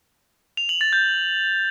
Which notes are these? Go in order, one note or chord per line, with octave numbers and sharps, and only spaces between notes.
F7
F#7
A6
G6